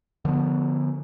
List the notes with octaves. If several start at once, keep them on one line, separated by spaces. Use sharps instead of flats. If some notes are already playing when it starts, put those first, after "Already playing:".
D3 F3 G#3 B3